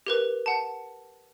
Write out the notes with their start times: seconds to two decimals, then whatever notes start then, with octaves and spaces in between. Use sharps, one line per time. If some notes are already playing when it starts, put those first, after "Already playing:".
0.07 G4 A#4 B4
0.46 F#5 A5